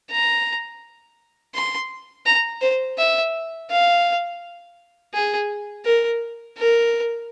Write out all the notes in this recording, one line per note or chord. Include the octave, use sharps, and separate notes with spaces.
A#5
C6
A#5
C5
E5
F5
G#4
A#4
A#4